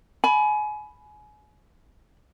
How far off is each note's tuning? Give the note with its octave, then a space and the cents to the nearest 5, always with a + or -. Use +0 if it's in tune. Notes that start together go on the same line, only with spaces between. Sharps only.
G#5 +30 B5 +0